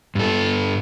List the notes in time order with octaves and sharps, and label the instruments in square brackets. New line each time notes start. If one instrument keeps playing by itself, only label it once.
[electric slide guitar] G2 A4